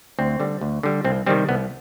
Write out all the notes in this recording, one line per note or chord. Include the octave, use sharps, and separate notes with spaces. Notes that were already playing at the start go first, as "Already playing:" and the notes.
D2 C4
D3 G3
D2
D3 G3
C2 C4
C3 D#3 G3 C4
C2 B3